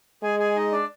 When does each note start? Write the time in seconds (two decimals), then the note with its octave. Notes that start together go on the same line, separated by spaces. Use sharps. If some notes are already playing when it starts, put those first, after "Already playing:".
0.23 G#3 G#4 G#5
0.39 G#4 G#5
0.56 D#4 D#5
0.72 D4 D5